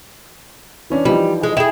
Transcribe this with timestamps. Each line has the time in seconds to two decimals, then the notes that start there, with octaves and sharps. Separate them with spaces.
0.90 E3 C#4 D4
1.05 E3 F3 G3 D#4
1.43 G#3
1.57 E4 G#4 G5 E7